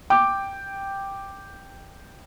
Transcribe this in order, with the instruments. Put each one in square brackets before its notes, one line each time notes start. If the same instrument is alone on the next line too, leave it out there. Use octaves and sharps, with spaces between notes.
[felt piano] G5 D6